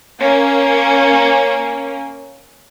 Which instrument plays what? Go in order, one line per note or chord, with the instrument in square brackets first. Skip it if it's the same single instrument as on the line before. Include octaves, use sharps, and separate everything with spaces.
[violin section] A#3 C#4